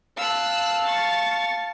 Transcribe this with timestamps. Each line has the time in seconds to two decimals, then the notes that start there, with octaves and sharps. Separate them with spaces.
0.17 F5 A5 E6 F#6
0.86 C#6 A6